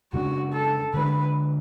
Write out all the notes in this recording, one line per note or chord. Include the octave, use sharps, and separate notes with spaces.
F#2 C#3 G#3 D4 F#4
A4
D3 G#3 D4 B4